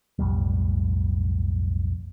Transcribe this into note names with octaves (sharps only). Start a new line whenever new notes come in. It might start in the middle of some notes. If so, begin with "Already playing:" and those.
B1 F2 A2 G3